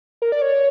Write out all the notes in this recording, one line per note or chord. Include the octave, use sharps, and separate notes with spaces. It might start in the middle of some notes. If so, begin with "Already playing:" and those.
A#4
D5
C#5